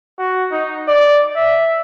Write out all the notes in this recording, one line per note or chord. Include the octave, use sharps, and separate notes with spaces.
F#4
D#4
D5
E5